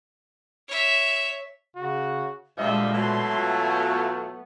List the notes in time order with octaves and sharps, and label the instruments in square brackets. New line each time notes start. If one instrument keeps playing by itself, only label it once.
[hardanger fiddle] C#5 E5
[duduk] C#3 [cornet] F#4
[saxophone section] D2 F3 E5 [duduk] A#2 [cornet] G3 [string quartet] G#3 D#5 A5
[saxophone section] B2 E3 F#3 [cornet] A3 [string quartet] B5 C6
[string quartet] B3 [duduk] F4